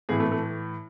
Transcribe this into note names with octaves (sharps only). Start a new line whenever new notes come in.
A2 E3 G#4
A3
A3